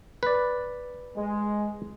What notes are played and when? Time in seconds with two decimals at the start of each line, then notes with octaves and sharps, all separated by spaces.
0.23 B4 D5
1.15 G#3